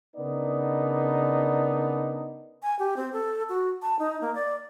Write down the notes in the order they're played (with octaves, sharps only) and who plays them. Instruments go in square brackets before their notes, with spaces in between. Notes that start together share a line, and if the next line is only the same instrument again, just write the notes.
[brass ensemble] C#3 B3 D4 D#4 A#4 D5
[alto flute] G#5
G4
C4
A4
F#4
A5
D#4
A#3
D5